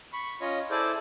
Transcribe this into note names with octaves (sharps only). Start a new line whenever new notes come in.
B5 C#6
C#4 F4 C#5 D#5
E4 G#4 A4 C5 D5